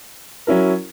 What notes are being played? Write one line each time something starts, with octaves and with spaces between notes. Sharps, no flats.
F#3 C#4 E4 A#4